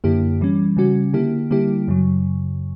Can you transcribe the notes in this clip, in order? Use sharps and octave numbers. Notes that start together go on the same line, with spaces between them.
F#2 D3 A#3 E4 G4
E3 G3 C#4
C#3 G3 C#4 F#4
D3 A#3 E4 G4
D3 G3 A#3 E4 G4
F#2 C#3 F#3